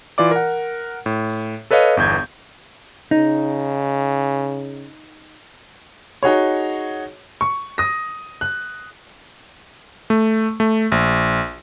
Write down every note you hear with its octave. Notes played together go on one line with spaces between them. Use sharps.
E3 F4 D5 D6
A#4 F#5
A2
A4 B4 C#5 D#5 F5
G1 E2 G6 G#6
C#3 D#4
D#4 F#4 G#4 C#5
C#6
D#6 A#6
F#6
A3
A3
A#1